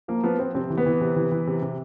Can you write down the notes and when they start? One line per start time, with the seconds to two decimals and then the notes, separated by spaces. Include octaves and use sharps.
0.08 F3 A#3
0.23 F3 B3
0.39 F3 C4
0.55 C3 C4
0.70 E3
0.77 B3
0.86 E3
1.01 C3
1.16 E3
1.32 E3
1.47 C3
1.62 C3